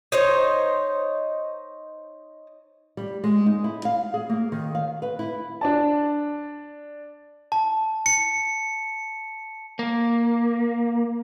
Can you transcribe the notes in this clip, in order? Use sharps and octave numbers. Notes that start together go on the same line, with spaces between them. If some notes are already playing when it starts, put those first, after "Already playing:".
D#4 C5 C#5
G3
G#3
D#4
E4
F5
G#4
A#3
D#3
F5
B4
E4
D4 D5 A5
A5
C#7
A#3